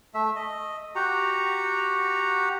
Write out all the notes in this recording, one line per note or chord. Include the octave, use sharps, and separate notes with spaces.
A3 E5
D#5
F#4 G4 F#5 A#5